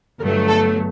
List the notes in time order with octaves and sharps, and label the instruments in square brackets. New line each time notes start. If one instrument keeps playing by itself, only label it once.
[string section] G1 G2 F#3 A3 A#4
A4